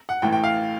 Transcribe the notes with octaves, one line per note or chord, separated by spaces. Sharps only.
F#5
A1 A2 E3 A3 G5
G5
F5